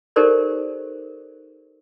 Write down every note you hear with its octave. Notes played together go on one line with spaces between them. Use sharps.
D#4 G4 A4 A#4 C5 D5